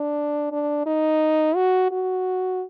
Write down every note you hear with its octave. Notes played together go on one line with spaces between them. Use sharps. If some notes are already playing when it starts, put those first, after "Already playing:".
Already playing: D4
D4
D#4
F#4
F#4